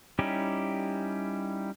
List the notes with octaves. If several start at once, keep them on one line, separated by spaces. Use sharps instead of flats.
G3 C#4 D#4 E4 G4